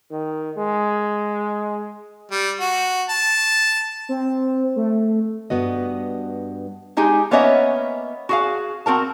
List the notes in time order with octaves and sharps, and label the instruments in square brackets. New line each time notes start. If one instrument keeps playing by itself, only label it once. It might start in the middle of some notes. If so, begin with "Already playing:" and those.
[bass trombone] D#3
G#3
[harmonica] G3
F#4
A5
[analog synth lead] C4
A3
[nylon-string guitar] G2 B3 F#4 D#5
[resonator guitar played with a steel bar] G#3 D#4 G4 G#4
A#3 B3 C#4 C#5 D#5 E5
F#4 G#4 F5
C4 F#4 A#4 A5